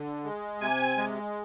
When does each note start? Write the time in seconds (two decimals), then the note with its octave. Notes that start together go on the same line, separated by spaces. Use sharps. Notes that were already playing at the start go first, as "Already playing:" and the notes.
Already playing: D3
0.24 G#3
0.61 C3 G#5
0.98 G#3